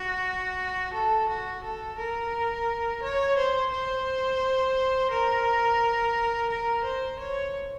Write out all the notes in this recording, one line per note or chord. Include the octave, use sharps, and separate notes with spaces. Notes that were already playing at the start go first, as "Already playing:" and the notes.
Already playing: F#4
A4
F#4
A4
A#4
C#5
C5
C5
A#4
A#4
C5
C#5